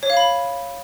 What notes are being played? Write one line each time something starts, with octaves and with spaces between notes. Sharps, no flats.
C#5
F5
B5